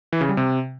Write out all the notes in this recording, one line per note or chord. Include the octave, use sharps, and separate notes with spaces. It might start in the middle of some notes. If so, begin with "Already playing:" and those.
E3
C#3
G3
C3